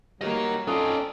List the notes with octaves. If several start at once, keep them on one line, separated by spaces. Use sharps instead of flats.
F#3 G3 A#3 A#4 D#5
C4 C#4 D#4 F4 A4 D5 D#6